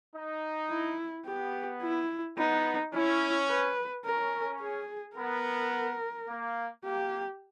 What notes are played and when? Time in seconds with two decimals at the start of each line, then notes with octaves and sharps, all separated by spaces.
0.14 D#4
0.70 E4
1.26 B3 G4
1.82 E4
2.38 B3 D#4
2.93 C#4 E4
3.49 B4
4.05 C#4 A#4
4.61 G#4
5.17 B3 A#4
6.28 A#3
6.84 A#3 G4